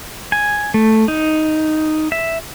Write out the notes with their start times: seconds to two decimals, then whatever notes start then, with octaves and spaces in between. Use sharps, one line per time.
0.32 G#5
0.74 A3
1.08 D#4
2.12 E5